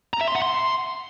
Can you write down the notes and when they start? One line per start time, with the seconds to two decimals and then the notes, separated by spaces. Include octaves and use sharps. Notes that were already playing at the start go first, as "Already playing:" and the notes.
0.14 A#5
0.21 E5
0.28 C6
0.35 F#5
0.42 C6